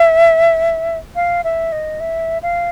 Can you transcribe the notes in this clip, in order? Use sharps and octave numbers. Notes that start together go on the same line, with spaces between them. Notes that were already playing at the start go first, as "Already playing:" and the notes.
Already playing: E5
F5
E5
D#5
E5
F5